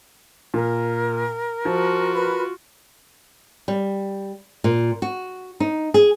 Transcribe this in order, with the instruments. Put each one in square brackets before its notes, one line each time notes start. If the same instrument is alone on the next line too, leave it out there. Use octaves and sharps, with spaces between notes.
[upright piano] A#2 [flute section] A#4
[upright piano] F3 [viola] F4 F#4
[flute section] A#4 B4 B5
[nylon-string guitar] G3
A#2
F#4
D#4
G#4